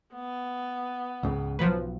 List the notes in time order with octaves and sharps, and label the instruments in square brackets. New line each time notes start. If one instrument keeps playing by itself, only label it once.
[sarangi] B3
[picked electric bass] C#2 C#3 [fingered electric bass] G#2 C#4
[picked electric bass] B1 [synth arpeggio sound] F3 F#3 B4